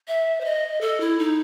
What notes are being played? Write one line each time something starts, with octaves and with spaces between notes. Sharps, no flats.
E5
C5
D#5
A4
E4
D#4